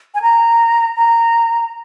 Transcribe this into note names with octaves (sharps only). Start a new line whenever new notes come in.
G#5
A#5
A#5